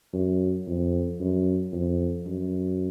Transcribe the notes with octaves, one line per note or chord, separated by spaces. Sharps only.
F#2
F2
F#2
F2
F#2